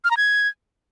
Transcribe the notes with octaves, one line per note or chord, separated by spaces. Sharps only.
F6
A#5
G#6